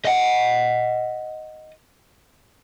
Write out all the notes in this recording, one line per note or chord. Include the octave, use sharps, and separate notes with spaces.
D#5 F#5